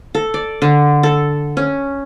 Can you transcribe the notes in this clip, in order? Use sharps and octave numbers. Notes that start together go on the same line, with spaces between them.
A4
D5
D3
A4
C#4